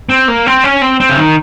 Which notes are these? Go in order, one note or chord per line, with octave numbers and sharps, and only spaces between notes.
C4
A#3
C4
C#4
C4
C4
C#3
D#3